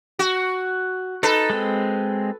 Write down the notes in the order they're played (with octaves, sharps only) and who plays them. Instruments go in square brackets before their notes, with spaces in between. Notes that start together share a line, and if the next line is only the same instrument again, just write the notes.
[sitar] F#4
[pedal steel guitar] D#4 [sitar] A4 B4
[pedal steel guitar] G#3 C4